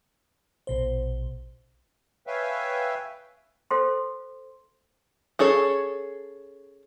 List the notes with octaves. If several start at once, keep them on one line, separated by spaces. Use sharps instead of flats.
A#1 B2 C5
B4 C#5 E5 F5 G5 G#5
A4 C5 C6
C#4 G#4 A4 C#5